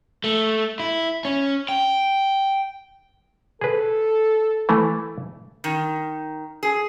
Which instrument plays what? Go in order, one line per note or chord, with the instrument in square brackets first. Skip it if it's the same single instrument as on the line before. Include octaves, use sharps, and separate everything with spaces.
[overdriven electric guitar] A3
E4
C#4
G5
[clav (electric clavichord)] G#4 B4 [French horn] A4
[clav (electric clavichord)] E3 A3
[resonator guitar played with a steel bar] D#3
G#4